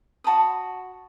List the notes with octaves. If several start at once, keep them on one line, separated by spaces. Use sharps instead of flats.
F#4 A5 B5 D#6